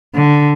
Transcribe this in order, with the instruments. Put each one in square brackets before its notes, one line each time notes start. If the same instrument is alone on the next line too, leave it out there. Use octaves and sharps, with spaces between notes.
[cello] D3